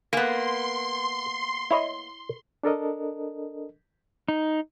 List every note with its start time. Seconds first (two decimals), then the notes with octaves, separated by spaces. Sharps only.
0.13 A#3 B3 G#5 C6
1.71 E4 C#5 D#5
2.63 D4 A4 A#4 D#5
4.28 D#4